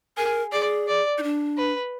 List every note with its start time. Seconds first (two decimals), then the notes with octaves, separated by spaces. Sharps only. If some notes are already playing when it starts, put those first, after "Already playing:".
0.17 G#4 A#4
0.52 G#4 D5
0.88 D5
1.18 D#4
1.23 D4
1.57 B4